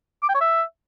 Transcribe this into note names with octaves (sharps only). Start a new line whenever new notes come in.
D6
G5
C#5
E5